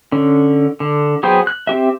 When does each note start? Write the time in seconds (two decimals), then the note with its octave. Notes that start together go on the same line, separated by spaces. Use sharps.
0.12 D3 C#4
0.80 D3
1.23 F#3 B3 G#4 C5 G5
1.47 F#6
1.67 C4 G4 E5